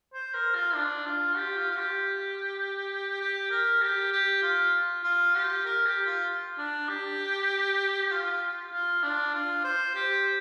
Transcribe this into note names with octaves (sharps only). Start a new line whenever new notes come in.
C5
A#4
F4
D4
F4
G4
F4
F4
G4
G4
A#4
G4
G4
F4
F4
G4
A#4
G4
F4
D4
G4
F4
F4
D4
F4
C5
G4